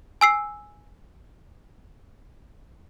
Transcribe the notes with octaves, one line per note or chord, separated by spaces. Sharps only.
G#5 E6 C7